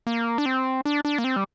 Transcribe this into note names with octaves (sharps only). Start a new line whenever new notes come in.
A#3
D4
C4
D4
D4
A#3
C4
G3